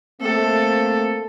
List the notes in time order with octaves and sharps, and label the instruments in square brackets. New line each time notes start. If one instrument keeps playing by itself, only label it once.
[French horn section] A3 A#3 C4 [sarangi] A4